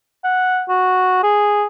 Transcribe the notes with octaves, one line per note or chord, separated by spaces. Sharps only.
F#5
F#4
G#4